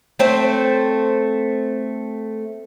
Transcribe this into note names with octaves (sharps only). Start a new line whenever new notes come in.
A3 C4 C5